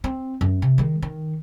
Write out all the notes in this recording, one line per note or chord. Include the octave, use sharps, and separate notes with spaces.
C4
F#2
C3
D#3 G#3
D#3